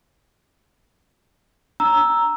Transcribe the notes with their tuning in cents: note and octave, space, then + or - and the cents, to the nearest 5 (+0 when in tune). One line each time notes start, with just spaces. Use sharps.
D4 +0 A#5 +0 E6 +0